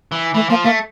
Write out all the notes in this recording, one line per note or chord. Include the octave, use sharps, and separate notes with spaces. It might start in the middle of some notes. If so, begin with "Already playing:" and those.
E3
E3 A3
F3 A#3
A3 A#3